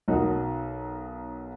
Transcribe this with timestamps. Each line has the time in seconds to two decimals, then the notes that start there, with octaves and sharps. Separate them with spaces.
0.08 B1 D#4 F#4 A#4